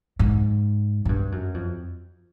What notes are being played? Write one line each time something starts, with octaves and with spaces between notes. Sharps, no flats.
G#2
G#2
G2
F#2
F2